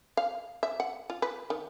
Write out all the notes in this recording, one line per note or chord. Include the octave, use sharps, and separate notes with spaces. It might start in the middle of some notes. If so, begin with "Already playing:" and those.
F5
E5
F#5
F4
B4
D#3